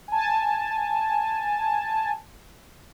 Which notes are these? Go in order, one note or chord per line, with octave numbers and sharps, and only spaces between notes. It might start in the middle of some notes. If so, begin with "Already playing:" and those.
G#5 A5